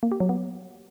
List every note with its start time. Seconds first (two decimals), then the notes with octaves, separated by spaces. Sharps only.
0.03 A#3
0.12 G4
0.20 F#3
0.29 B3